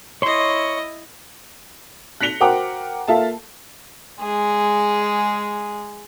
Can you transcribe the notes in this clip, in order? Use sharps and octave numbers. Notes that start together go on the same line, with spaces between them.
E4 C#5 D#5 C6
F#6 A#6 B6 C#7 F7 G7
F#4 A#4 C5 F#5 G5 D6
A#3 F4 A4 E5 F5 A5
G#3 G#4